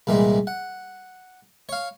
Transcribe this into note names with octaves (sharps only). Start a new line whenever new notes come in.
C2 A#2 E3 G3 G#3
F#5
C#5 F5